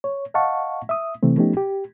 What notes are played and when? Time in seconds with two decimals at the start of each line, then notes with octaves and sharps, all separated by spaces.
0.04 C#5
0.34 D#5 F5 F#5 A5 C#6
0.89 E5 D#6
1.23 C3 E3 A3 C4
1.37 F3 A3 B3 C#4 D#4 G4
1.57 G4